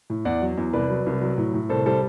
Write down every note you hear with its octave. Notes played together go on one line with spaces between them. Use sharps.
A2
E2 D5 F#5
F#3
E2
C2 B4 D5
F#3
C2
F#3
A2
A2
C2 A4 C5
G3 A4 C5